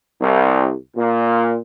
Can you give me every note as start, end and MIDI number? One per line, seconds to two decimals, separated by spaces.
0.20 0.74 36
0.95 1.57 46